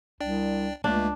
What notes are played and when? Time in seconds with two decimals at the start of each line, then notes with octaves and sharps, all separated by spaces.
0.20 C2 D4 D5 G5
0.84 C#2 A3 A#3 D4